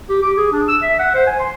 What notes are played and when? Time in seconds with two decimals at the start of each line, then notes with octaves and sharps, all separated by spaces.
0.09 G4
0.22 D6
0.37 G#4
0.52 D4
0.68 E6
0.82 E5
0.99 F#5
1.15 C5
1.27 G#5
1.39 C6